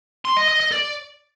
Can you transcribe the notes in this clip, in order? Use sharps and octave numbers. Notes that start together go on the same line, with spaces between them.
C6
D#5
D#5
D#5
D5